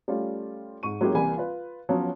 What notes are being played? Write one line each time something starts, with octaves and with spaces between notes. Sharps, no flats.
G3 A3 C#4 F4
G#2 C#6 D#7
F#3 G#3 A#3 C#4 E4 G4
C2 E3 G3 A#3 G#5 B5
F4 B4
F3 F#3 B3 C#4